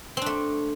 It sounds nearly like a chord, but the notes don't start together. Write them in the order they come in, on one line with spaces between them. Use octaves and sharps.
C4 D4 A3